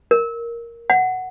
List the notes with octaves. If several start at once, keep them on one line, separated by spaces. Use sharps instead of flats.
A#4
F#5